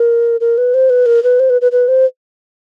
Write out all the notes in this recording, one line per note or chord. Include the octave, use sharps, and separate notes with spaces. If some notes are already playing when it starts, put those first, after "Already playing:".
Already playing: A#4
A#4
B4
C5
B4
A#4
B4
C5
B4
B4
B4
C5